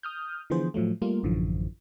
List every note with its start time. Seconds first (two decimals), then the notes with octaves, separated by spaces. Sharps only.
0.03 D#6 F6 G6
0.50 D3 E3 F3 B3 G#4 C5
0.74 A2 F3 F#3 A3
1.02 G3 A3 A#3 F4
1.23 A1 F#2 D3 E3 F3